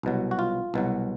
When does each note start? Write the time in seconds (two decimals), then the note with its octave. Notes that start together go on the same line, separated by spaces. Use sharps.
0.03 C2 B2 F#3
0.31 F#4
0.39 F4
0.74 C2 B2 F#3